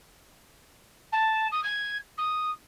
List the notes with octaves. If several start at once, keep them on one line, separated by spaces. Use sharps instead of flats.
A5
D#6
G#6
D#6